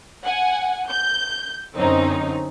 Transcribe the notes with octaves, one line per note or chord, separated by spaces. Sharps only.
F#5 G#5
G6
F#2 D3 C4 C#4 D#4